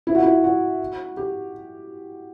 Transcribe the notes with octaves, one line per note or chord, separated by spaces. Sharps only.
E4
F#4
E4
F#4
G4